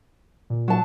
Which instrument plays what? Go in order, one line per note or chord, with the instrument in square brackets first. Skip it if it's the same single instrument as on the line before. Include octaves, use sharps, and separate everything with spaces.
[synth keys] A#2
[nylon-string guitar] F#3 A5